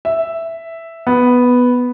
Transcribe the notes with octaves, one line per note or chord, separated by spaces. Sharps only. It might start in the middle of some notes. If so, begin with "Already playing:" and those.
E5
B3